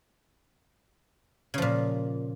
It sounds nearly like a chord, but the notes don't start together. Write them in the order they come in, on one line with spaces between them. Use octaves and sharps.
C#3 F3 A#2